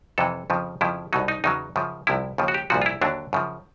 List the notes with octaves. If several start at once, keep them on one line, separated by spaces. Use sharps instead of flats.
F2 C3 E3 A4
F2 C#3 F3
F2 C#3 F3 E4
C2 B2 F#3 D#4
D#4
E2 C#3 F#3 D#4
F#2 C#3 F3
C2 C3 F3 E4
D#2 C#3 F3
F#4
G4
C2 A#2 F3 F#4
F4
E4
D#2 D3 F#3 D4
F#2 C#3 F3